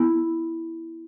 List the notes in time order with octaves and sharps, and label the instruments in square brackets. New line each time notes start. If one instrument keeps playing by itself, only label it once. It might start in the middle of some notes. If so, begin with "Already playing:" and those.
Already playing: [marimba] B3 E4